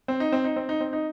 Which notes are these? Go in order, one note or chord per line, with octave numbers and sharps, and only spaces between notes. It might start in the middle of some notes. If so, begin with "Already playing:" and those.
C4
D#4
C4
D#4
C4
D#4
C4
D#4